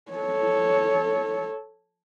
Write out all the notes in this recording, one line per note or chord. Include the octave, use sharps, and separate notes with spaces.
A4 C#5